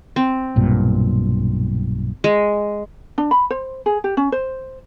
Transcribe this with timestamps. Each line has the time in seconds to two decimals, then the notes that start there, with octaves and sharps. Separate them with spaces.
0.16 C4
0.56 B1 G2 A#2
2.24 G#3
3.18 D4
3.31 B5
3.50 C5
3.86 G#4
4.04 G4
4.17 C#4
4.32 C5